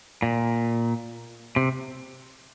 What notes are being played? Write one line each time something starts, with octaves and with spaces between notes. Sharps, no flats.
A#2
C3